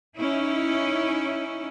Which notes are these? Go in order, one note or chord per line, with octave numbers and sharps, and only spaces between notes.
C#4 D#4 E4